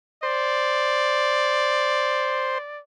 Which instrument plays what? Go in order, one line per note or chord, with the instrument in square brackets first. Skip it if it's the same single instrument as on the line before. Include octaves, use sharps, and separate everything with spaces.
[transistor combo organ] C5 [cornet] D5